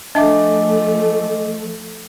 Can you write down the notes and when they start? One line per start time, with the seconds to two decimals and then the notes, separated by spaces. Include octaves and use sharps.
0.15 F3 A3 D4 D#5 E5 G#5 D6